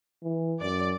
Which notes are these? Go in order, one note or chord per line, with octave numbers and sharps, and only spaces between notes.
E3
F#2 D5